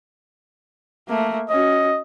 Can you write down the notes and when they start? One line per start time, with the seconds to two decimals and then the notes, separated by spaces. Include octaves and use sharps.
1.08 A3 A#3
1.50 C#4 F#4 D#5